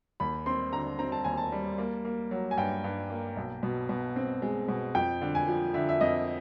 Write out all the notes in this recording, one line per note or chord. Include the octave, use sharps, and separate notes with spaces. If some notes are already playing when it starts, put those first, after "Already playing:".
D#2 B5
C4 C6
D3 A#5
C4 A#5
A5
D#2 G#5
A5
G3
A#3
A#3
F#3
G#5
G2 G5
G2
A#3
B1
B2
B2
C4
G#3
B2
F2 G5
D3
G#5
F3
D3 E5
E5
F2 D#5